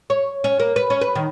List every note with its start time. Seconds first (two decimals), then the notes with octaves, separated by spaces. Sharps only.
0.10 C#5
0.44 C#4
0.60 A#3
0.76 B4
0.90 C#4
1.01 B4
1.15 D#3